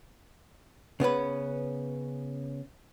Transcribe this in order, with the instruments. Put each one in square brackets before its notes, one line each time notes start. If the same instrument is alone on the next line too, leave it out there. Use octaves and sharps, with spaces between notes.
[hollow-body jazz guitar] C#3 B3 C#4 B4